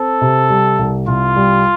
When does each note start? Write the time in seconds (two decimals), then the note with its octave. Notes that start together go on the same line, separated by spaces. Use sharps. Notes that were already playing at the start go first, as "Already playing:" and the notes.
Already playing: C4 A4
0.21 C3
0.50 G3
0.79 C2
1.08 C2 F4
1.36 G3